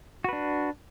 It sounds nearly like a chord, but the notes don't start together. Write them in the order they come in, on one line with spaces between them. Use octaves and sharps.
F#4 B4 D4